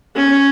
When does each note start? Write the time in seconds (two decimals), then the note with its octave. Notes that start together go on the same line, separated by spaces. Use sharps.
0.16 C#4